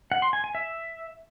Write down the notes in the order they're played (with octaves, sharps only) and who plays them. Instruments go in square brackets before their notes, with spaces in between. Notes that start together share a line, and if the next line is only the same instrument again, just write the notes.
[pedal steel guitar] F#5
C6
G#5
G#5
E5